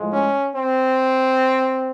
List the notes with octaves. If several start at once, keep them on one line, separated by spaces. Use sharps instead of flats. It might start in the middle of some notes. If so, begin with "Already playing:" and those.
Already playing: A2 F3 G#3
C#4
C4